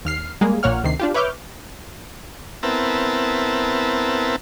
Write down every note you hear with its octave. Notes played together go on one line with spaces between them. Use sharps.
D#2 F6 C7
G3 G#3 A#3 G#4
A#1 A#2 A#3 C#5 F#5 F6
D2 C3 D#3 C7
D4 F4 G4
B4 C#5 E5 D6 F6 G6
B3 C4 E4 A#4 A5